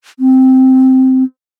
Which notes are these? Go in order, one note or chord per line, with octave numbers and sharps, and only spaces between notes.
C4